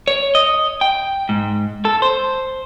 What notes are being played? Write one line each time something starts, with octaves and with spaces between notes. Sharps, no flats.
C#5
D#5
G5
G#2
A4
C5